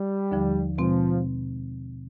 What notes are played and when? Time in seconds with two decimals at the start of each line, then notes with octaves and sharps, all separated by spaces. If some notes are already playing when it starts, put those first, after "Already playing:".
Already playing: G3
0.31 D#2 D3 F3
0.78 B2 F3 G#3 C4